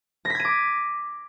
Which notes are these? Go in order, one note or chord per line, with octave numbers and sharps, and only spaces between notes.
D6 G#6 A#6 B6 D#7